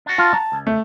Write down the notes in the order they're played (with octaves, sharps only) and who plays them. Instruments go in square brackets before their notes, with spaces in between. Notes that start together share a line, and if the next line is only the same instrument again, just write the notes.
[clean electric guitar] D4 F#4
[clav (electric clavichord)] F4 [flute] A5
[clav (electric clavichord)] A#5
[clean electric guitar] C#2
[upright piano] A3